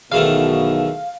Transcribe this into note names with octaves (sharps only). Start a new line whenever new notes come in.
B1 E2 B2 D#3 A3 F5